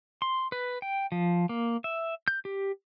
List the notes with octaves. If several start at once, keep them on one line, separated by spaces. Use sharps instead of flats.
C6
B4
G5
F3
A#3
E5
G6
G4